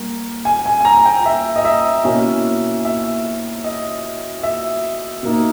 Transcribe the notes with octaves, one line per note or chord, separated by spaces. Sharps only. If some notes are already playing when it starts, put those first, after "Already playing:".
Already playing: G3 A#3
G#5
G#5
G#5
A#5
G5
E5
D#5
E5
B2 A#3 C#4 E4
E5
D#5
E5
B2 A#3 D#4